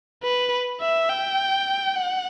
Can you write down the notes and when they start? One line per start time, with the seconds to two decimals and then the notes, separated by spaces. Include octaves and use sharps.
0.23 B4
0.81 E5
1.10 G5
1.95 F#5